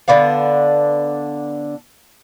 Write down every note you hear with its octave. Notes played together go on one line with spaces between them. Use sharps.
D3 B3 D4 F5